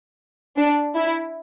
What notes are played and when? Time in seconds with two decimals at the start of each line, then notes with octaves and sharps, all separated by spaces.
0.57 D4
0.96 E4